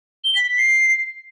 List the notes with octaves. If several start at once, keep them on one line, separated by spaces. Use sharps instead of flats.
G7
B6
B6
C7